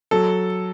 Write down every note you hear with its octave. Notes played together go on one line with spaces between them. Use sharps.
F#3 A4